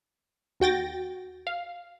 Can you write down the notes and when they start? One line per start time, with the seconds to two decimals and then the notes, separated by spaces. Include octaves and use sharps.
0.60 D#2 F#4 G5 A6 A#6
1.47 F5